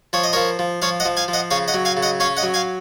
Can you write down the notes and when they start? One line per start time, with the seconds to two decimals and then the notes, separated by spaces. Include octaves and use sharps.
0.13 F3 C#5
0.24 D#5
0.33 F3 A#4 C#5
0.59 F3
0.82 F3 C#5 F5
1.00 D#5 F#5
1.05 F3
1.17 F5 G#5
1.28 F3
1.33 D#5 F#5
1.51 C#3 C#5 F5
1.68 D#5 F#5
1.74 F#3
1.85 F5 G#5
1.97 C#3
2.03 D#5 F#5
2.20 C#4 C#5 F5
2.37 D#5 F#5
2.43 F#3
2.54 F5 G#5